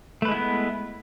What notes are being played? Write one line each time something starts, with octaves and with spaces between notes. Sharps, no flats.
G#3 A3 B3 E4 B4